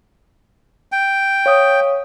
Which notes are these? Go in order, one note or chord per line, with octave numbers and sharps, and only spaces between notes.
G5
C#5 F5 D#6